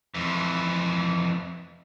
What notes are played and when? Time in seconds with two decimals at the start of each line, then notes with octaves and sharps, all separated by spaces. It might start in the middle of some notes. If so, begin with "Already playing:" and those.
0.15 F2 E3